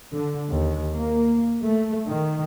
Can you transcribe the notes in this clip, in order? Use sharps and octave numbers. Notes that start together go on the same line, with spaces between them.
D3
D#2
A#3
A3
D#3